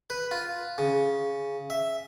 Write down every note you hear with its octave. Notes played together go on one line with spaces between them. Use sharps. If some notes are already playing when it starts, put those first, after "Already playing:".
B4
F4
C#3
E5